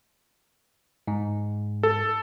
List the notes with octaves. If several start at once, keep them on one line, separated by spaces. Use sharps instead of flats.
G#2
A4